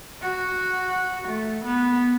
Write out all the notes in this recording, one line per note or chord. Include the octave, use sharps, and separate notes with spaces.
F#4
A3
B3